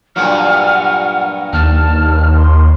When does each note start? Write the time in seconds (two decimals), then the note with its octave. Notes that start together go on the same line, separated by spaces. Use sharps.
0.16 G2 A#2 F#3 F#5 F6
1.53 D#2 A5 F6
2.37 C6